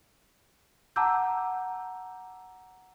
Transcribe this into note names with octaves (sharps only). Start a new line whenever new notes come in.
F#5 A5 A#5 D6 E6 G6